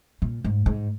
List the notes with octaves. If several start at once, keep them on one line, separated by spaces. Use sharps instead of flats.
A#2
G#2
G#2